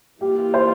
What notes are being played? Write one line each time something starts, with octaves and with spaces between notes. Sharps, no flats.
E3 G3 A#3 F4 G4
C5